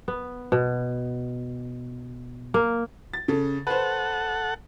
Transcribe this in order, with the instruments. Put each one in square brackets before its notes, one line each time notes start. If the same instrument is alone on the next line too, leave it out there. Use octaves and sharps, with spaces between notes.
[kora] B3
B2
A#3
[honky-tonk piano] A6
C#3 A4
[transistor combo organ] A4 F#5 [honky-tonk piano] B4 C5